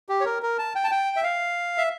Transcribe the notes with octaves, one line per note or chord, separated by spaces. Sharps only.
G4
C#5
A#4
A#4
A5
G5
A5
G5
E5
F5
E5